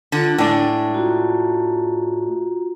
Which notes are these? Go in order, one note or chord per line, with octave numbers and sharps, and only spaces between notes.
D3 F4
A2 G#3 D4
F4 F#4 A#5